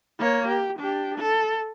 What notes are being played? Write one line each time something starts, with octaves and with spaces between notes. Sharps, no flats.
A#3 C#5
G4
D4 G4
A4